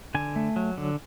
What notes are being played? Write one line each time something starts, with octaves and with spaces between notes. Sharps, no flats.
D3 G#5
A3
F#3
D3